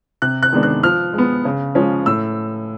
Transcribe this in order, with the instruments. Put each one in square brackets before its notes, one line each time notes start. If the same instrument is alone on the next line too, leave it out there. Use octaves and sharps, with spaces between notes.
[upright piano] C3 F#6
F#6
D#3 G#3 B3 D4
F#6
F3 F6
G#3 B3
C#3
F3 G#3 C#4
A2 E6